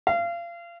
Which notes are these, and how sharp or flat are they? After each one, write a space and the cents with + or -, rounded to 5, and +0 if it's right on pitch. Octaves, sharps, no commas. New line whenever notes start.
F5 -30